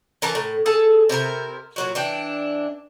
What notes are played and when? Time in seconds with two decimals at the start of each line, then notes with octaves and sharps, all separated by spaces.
0.22 E3 A#4 A5 A#5
0.35 A2
0.66 G#4 A4 A5
1.09 C3 E4 A4 A#4
1.76 A#2 F#3 F#4
1.95 E3 D4 G5